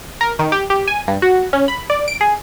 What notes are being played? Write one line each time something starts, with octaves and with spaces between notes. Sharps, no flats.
A#4
D#3
G4
G4
G#5
G2
F#4
C#4
B5
D5
D7
G#4